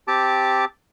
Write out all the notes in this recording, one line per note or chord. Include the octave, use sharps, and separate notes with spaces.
C4 G4 A5 D6